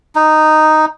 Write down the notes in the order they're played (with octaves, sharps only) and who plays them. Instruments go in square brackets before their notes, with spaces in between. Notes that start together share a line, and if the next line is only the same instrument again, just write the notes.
[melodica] D#4